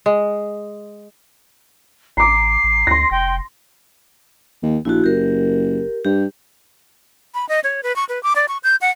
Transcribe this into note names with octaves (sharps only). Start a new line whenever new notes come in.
G#3
A1 A#5 D6 C7
A1
D2 C6 A#6
F1 G5
D#2
A#1 E4 F#4
F#1 G4 A#4
G2 G4
B5
D#5
C#5
B4
C#6
B4
D6
D5
C#6
G6
F#5